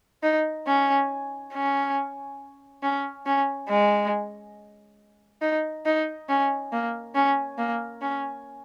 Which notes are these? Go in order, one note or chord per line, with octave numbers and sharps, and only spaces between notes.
D#4
C#4
C#4
C#4
C#4
G#3
D#4
D#4
C#4
A#3
C#4
A#3
C#4